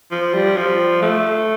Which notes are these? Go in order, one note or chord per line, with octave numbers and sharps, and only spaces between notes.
F3
G3
F3
A3